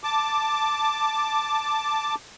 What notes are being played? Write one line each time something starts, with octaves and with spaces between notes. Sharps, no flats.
A5 D6